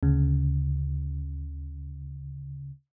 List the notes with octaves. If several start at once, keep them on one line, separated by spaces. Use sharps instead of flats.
D2 C#3